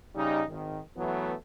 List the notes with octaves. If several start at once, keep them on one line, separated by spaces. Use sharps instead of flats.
C#3 G3 D#4
G#1 D#3
E3 F#3 A3 B3